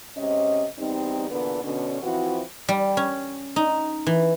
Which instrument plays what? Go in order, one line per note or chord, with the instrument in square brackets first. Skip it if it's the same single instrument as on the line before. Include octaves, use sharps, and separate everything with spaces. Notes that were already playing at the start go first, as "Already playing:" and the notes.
[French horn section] G#2 C3 C#4 D#5
E2 G3 C4 D#4
E2 A#2 D3 B3 D4 B4
B2 D3 C#4
E3 F3 C4 E4 F#4
[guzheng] G3
C#4
D#4
E3